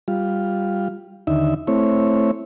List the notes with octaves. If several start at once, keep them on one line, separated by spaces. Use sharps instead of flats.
G3 F4
D#2 D3 D#4 E5
A3 C4 E4 C#5